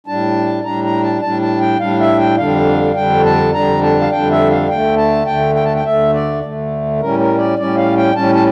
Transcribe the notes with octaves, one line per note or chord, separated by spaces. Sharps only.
A2 G3 D4 A5
A2 G3 D4 A#5
A#5
A5
A2 G3 D4 A5
A5
G5
A2 G3 D4 F5
E5
G5
F2 D3 G3 D4 F5
F2 D3 G3 D4 G5
A5
F2 D3 G3 D4 A#5
A5
F5
F2 D3 G3 D4 G5
E5
F5
D2 D3 A3 G5
A5
D2 D3 A3 G5
G5
A5
G5
D2 D3 A3 E5
D5
D2 D3 A3
A2 G3 C#4 A#4
A#4
D5
A2 G3 C#4 D5
F5
G5
A2 G3 C#4 A5
A5